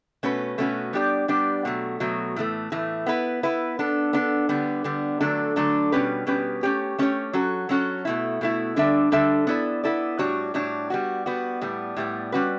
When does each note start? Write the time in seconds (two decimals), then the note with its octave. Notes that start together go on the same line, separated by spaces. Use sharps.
0.23 B2 A3 C#4 F#4 B4
0.58 B2 A3 C#4 F#4 B4
0.93 G3 B3 D4 G4 D5
1.28 G3 B3 D4 G4 D5
1.65 B2 F#3 A3
2.00 B2 F#3 A3
2.36 A2 E3 A3
2.72 A2 E3 A3
3.06 B3 E4 B4
3.43 B3 E4 B4
3.79 B3 D4 A4
4.13 B3 D4 A4
4.49 D3 G3 B3
4.84 D3 G3 B3
5.21 D3 F#3 A3 D4 A4
5.56 D3 F#3 A3 D4 A4
5.92 B2 G3 C#4 G4 B4
6.27 B2 G3 C#4 G4 B4
6.63 A3 C#4 G4 C#5
6.98 A3 C#4 G4 C#5
7.33 F#3 C#4 F#4 A4
7.69 F#3 C#4 F#4 A4
8.05 B2 A3 E4
8.41 B2 A3 E4
8.76 D3 G3 D4 A4 E5
9.12 D3 G3 D4 A4 E5
9.47 B3 E4 A4 D5
9.84 B3 E4 A4 D5
10.18 A2 G3 D4 F#4 C#5
10.54 A2 G3 D4 F#4 C#5
10.90 G3 B3 F#4
11.26 G3 B3 F#4
11.62 A2 G3 B3
11.97 A2 G3 B3
12.32 G3 C#4 F#4 B4